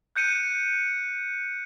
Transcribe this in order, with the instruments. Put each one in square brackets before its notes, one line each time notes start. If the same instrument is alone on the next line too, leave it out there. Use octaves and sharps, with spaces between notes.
[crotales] F#6 G6 C#7 D#7